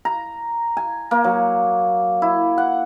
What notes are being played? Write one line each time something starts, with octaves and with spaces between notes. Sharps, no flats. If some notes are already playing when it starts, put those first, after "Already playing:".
A#5
G#5
A#3
F#3
E4
F#5